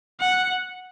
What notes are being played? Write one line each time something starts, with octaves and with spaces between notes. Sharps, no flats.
F#5